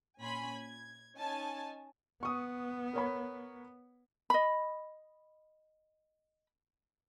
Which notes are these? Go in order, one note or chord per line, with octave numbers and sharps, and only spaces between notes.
A#2 C#4 G#5 B5 C6
G#6
C#4 D#4 G#5 A5
B3 C#6 D#6
A#4 C#5 B5
D#5 B5